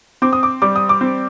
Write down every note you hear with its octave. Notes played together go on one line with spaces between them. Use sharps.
C4 D6
D#6
D6
G3 D6
D#6
D6
C4